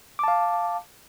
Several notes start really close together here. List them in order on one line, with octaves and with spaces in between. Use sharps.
D6 A5 F5